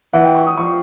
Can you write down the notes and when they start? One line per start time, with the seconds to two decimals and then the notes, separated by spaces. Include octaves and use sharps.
0.13 E3 F#5
0.24 G5
0.35 C#6
0.47 D#6
0.57 F3 C#6